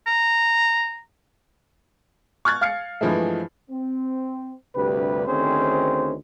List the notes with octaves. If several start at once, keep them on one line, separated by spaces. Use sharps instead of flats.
A#5
C#6 F6 F#6 G#6 A6
F5 F6 G#6 C7 C#7
G2 E3 F3 G#3 A3
C4
D2 G2 C3 G4 B4
D2 D#3 C4 C#4 G#4 C5